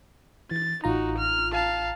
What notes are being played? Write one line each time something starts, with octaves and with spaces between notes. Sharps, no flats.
E3 A6
A1 D#4 F4 F#4 A#5
F6
F5 A5